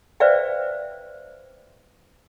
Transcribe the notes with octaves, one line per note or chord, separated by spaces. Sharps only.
B4 C5 D5 E5 F5 G5